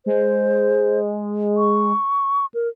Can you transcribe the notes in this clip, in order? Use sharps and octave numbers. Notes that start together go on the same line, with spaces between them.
G#3 C5
C#6
A#4